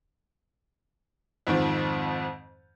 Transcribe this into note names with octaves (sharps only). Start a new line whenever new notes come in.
F2 G#2 D#3 F3